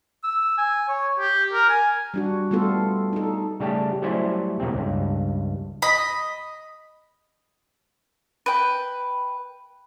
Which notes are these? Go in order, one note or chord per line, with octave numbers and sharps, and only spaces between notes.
E6
G#5
C#5
G4
A#4
G#5
G3 D4 F#4
G3 A3 B3 F4 A4
D#4 A4
C#3 G3 A3 G4 A5
F#3 G3 A3 C#4 E4 C5
E2 A#2 C#3 C4
C#2 G2
D#5 B5
B4 G5